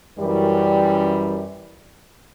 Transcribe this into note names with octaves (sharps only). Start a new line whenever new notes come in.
F#2 E3 G3